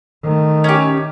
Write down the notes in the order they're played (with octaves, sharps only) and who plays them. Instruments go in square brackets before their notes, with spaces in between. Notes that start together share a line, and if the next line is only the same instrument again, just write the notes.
[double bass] D#3 A3
[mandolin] C#4 G4